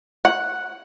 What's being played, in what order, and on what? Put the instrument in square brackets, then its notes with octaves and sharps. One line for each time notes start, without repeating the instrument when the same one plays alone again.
[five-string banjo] F#5